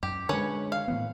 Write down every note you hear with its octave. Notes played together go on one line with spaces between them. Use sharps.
F#2 G4
D3 G#3 C#4 B4 C#5
F5
A2 E3 B3